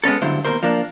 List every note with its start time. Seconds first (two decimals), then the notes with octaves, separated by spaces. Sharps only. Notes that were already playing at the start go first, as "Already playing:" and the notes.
0.04 G#3 B3 C#4 A4
0.22 C#2 G2 D3 F#3 E4 C5
0.45 D#2 G#2 B2 A#4 C5
0.63 F3 A#3 D4